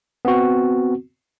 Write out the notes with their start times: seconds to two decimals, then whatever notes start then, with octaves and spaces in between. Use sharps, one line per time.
0.25 B3 C4 F#4